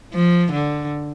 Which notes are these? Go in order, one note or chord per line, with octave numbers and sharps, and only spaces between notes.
F3
D3